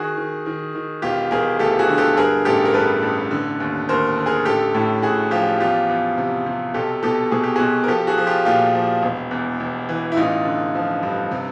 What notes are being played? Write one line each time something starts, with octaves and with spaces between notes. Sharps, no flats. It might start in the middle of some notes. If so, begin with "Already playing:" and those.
Already playing: D#3 F#4 G#4
D#3
D#3
D#3
E1 F4 G4
E1 G#4 A#4
D2 G4 A4
F#4 G#4
D3
G4 A4
G2 G#4 A#4
A1 G4 A4
A#4
G2 A4 B4
A1
D3
D#2
D#2 A#4 C5
D3
G#4 A#4
A1 G4 A4
A2
A1 F#4 G#4
F3 F4 G4
E2 F4 G4
E2
C3
C3
B1 G4 A4
B2 G4 A4
B2 G#4
G4
B1 F#4 G#4
A#4
F3 G4 A4
F#4 G#4
F3
F4 G4
A#2 F4 G4
F3
E1
E2
E1
E3
E4
A1 D#4 F4
D3
F3
G2
C3